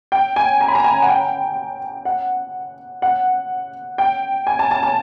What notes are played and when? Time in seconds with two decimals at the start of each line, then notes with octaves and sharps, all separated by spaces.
0.12 G5
0.36 G#5
0.61 A#5
0.68 B5
0.75 A#5
0.84 G#5
1.02 F#5
1.08 G5
2.05 F#5
3.02 F#5
3.98 G5
4.47 G#5
4.59 A5
4.71 A5
4.83 A5